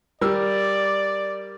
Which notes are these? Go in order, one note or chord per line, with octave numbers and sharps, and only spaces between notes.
G3 A#4 D5 E6